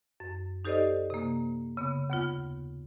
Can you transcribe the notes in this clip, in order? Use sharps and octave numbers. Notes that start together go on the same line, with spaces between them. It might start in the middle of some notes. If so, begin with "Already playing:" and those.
F#2
D#4 G4 A4 C5 D5 D#5
C3 A#3
C#3 B3
D#2 B3 F4